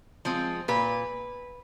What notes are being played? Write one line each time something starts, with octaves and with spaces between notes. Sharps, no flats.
F3 G#3 C4
A#2 B4